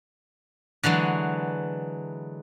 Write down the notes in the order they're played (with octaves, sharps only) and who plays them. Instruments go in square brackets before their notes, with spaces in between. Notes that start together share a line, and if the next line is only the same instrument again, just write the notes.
[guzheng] D3 E3 F#3 G#3